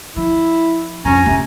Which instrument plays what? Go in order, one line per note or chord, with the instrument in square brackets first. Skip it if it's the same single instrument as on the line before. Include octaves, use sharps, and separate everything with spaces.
[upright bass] F3 [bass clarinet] E4
[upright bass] F2 D4 [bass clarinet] C#4 [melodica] G#5 A#5
[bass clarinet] C3 [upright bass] B3 C#4